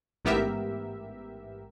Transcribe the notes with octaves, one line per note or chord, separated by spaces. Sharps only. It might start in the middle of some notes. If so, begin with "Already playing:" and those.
A1 G#2 B3 G4 A#4 E5